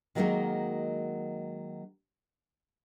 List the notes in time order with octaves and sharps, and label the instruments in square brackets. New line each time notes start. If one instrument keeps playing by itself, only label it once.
[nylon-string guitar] D#3 F#3 G#3 A#3 D#4 F#4